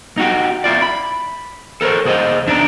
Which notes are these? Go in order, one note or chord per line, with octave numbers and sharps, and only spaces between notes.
D#4 F#4 G4
E4 F4 D5
B5
A4 A#4 C5 C#5
C#2 G#4 C5 D#5
E2 D4 D#4 D5 A#5